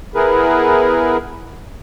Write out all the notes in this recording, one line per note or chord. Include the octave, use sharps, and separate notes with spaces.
B3 E4 G#4 A#4 B4